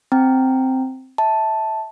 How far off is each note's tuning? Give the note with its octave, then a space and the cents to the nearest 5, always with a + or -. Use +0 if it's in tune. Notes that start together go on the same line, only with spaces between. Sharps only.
C4 +0 G5 +0 A#5 -15
E5 -25 A5 +0